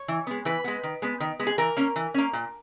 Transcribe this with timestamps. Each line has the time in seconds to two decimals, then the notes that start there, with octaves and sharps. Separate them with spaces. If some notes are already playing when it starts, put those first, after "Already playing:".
Already playing: C#5
0.08 E3
0.27 G#3 B3
0.45 E3 B4
0.64 G#3 B3
0.83 D#3
1.02 G#3 B3
1.20 D#3
1.39 G#3 B3
1.47 G#4
1.58 E3 A#4
1.77 A#3 C#4
1.96 E3
2.14 A#3 C#4
2.33 A#2